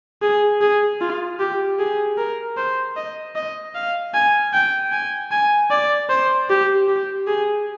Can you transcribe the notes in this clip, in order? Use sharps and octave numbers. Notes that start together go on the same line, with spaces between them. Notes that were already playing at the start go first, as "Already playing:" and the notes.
G#4
G#4
F4
G4
G#4
A#4
C5
D#5
D#5
F5
G#5
G5
G#5
G#5
D5
C5
G4
G4
G#4